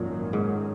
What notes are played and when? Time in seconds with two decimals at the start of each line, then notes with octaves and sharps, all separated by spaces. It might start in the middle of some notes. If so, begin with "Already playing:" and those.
Already playing: G#1 F#2 A#2 D#3 F#3
0.33 G#2